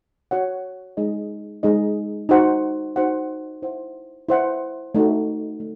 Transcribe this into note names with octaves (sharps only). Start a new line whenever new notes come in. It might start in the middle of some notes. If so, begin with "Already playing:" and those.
F#4 C#5 F#5
G#3 D#4 G#4 D#5
G#3 D#4 G#4 D#5
D#4 F#4 C5 F#5
D#4 F#4 C5 F#5
E4 C5 F#5
E4 C5 F#5
A3 D#4 F#4
A3